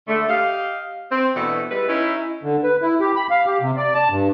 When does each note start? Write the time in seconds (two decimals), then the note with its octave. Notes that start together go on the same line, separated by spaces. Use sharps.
0.08 D3 A3
0.27 G4 D#5 F5
1.11 C4
1.35 B2 E3 A3 D4 F#4
1.70 G3 G#3 E4 B4
1.87 C#4 D#4 E4
2.43 D3
2.64 B4
2.82 E4
3.00 G4
3.15 B5
3.30 F5
3.46 G4
3.62 C3
3.77 D5
3.94 A5
4.09 G2